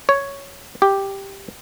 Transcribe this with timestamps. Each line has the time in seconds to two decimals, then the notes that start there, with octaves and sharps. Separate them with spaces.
0.09 C#5
0.82 G4